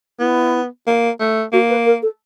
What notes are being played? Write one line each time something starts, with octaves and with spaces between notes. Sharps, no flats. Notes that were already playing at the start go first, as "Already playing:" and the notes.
B3 E4
A#3
A3
A#3 F#4
B4
A#4
A4